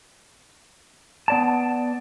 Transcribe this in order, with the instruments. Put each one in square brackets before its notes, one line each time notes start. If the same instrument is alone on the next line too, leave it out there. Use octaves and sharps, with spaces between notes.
[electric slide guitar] B3 D5 A5